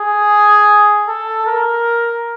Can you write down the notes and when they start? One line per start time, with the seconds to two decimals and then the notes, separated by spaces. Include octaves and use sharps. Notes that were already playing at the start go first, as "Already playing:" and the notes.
Already playing: G#4
1.07 A4
1.46 A#4